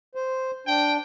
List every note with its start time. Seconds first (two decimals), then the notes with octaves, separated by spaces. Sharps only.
0.15 C5
0.67 D4 G5